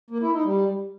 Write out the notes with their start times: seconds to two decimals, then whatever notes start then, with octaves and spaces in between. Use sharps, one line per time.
0.10 A#3
0.22 E4
0.33 D#4
0.45 G3